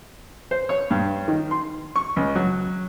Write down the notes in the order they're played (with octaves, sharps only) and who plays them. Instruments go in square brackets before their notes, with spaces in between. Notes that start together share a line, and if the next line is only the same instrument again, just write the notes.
[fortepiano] C5
C#5
G2
D#3
C6
C#6
C#2
F#3